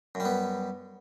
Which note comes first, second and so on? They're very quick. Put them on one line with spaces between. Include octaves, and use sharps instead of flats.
F#2 G3 B3